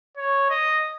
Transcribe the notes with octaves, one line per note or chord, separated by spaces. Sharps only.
C#5
D#5